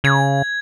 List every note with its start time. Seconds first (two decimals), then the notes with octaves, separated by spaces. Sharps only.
0.04 C#3 G#6